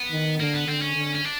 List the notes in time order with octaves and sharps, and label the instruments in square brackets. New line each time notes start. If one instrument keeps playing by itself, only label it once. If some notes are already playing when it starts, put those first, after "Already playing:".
Already playing: [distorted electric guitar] B3
[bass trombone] D#3
[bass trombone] D3 [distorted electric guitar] A#3
[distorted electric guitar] B3
[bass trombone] D3 [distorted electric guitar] C4
[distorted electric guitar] C#4
[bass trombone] D3
[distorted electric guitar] C#4
D4